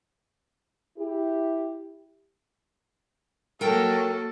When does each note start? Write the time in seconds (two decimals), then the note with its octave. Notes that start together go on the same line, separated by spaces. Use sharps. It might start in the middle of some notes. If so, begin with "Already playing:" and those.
0.98 E4 G4
3.61 F#3 A#3 A4 A#4 G5